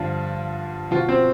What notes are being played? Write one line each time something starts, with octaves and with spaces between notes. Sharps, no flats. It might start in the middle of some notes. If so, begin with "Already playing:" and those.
Already playing: G2 D3 F3 F4
B2 F3 F4
C4 C5